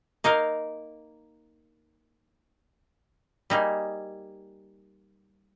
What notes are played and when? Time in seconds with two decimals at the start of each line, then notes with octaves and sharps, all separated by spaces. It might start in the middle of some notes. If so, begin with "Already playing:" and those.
0.24 A#3 D#4 A#4 F5
3.50 G3 A#3 D#4 G#4